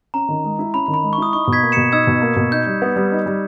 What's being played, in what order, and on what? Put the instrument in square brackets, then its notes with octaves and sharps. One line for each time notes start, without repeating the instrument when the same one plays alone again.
[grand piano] C#4 [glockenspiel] A#5
[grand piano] D#3
G#3
E4
[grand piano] C#4 [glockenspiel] B5
[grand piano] D#3
[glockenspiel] B5
[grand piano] G#3
[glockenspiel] C#6
[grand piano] E4 [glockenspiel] D#6
[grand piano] D#4 [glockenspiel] C#6
[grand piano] B2
[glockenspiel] G#6 B6
[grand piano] A#3
[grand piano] B2 [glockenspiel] C#7 E7
[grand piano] D#4 [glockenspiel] E6 G#6
[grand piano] B2
A#3
B2
[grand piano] D#4 [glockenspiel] G6
[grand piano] G3
B3
G3
D#4
G3